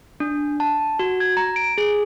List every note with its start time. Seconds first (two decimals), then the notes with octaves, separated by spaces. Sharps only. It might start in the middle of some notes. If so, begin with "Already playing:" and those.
0.20 D4
0.60 A5
0.99 F#4
1.20 G#6
1.37 A#5
1.56 D7
1.78 G#4